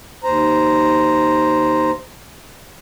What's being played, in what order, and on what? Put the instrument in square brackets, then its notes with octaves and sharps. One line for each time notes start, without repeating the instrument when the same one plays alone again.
[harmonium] D#2 C5 A#5